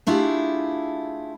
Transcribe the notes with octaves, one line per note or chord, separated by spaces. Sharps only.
A3 D4 E4 F4 G4 G#4